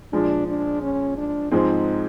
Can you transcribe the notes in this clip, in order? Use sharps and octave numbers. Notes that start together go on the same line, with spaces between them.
A#2 F3 G#3 D4
D4
C#4
D4
G#2 F3 G#3 C4 D#4